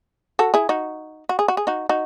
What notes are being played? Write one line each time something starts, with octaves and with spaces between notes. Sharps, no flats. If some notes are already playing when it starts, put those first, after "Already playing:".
F#4 A4
E4 G#4
D#4 F#4
F#4
G#4
F#4
G#4
D#4 F#4
D#4 F#4